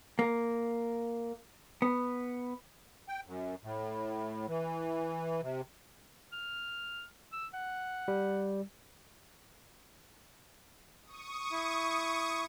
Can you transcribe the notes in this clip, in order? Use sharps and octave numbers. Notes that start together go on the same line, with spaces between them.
A#3
B3
G5
F#2
A2
E3
C3
F6
E6
F#5
G3
C#6 D#6
E4